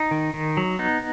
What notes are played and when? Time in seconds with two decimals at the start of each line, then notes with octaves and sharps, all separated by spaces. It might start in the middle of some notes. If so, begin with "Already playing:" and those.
Already playing: D#4
0.11 D#3
0.34 D#3
0.57 F#3
0.79 B3 D#4